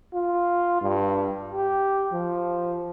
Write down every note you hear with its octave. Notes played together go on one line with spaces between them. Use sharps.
F4
G2
G4
F3